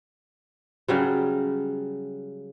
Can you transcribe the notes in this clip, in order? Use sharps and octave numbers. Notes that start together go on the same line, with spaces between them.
C#3 F#3 G3